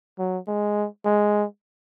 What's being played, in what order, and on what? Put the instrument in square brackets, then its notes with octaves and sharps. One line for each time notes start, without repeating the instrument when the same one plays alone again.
[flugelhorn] F#3
G#3
G#3